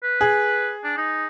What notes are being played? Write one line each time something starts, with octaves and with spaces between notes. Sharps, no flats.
B4
G#4
D4
D#4